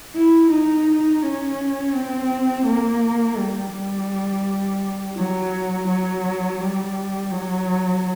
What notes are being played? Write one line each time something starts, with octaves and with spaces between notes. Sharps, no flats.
E4
D#4
C#4
C4
A#3
G3
G3
F#3
F#3
G3
F#3